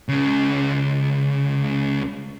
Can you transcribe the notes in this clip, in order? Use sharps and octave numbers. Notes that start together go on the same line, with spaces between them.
C#2 C#3